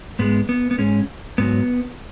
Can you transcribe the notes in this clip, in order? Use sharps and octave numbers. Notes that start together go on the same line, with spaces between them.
G#2 G#3 B3
B3
B3
G#2 G#3 C#4
G#2 F#3 B3